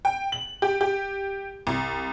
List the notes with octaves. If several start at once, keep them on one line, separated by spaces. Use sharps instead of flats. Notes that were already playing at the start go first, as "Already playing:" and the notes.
G5
F#7
G4
G4
C2